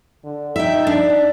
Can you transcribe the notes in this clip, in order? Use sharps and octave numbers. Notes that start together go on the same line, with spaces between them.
D3
D#4 E5 G5
D4